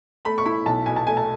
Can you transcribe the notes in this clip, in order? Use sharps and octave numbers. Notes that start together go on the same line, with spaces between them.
A3 B5
C#6
E4 B5
B1 A5
B2 G#5
A5
A3 G#5
A5